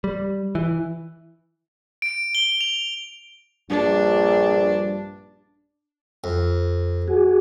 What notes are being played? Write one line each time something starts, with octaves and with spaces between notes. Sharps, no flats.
G3
E3
D7
G7
F7
A#1 G2 D4
F2
F#4 G#4